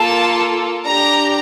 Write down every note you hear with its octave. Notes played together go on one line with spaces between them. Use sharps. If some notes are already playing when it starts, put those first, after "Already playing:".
Already playing: A#3 F4 A4 A5
D4 G4 A#5